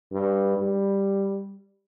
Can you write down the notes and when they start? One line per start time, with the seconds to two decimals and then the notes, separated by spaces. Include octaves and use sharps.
0.12 G2
0.57 G3